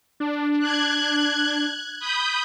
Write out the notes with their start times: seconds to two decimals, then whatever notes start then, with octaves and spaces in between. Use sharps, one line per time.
0.20 D4
0.59 F#6 G#6
2.00 B5 D#6 G6